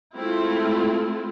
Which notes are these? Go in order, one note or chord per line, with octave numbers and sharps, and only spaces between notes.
G#3 A3 C4 E4 F4